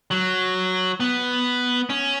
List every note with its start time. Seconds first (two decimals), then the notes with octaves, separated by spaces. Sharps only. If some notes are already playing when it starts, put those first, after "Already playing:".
0.11 F#3
1.00 B3
1.90 C#4